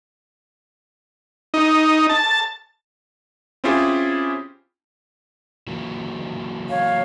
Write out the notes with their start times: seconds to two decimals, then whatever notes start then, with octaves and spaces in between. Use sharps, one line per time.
1.54 D#4
2.09 A5
3.64 C4 C#4 E4 F4 G4 G#4
5.67 E3 F#3 A#3
6.70 C#5 F5